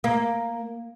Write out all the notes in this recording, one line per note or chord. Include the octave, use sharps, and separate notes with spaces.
A#3